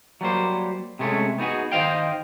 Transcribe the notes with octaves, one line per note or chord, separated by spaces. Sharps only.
F#3 G3 A#3 C5
C3 G#3 A3 C#4
B3 D#4 F#4 G#4
D#3 C5 D#5 F5 G5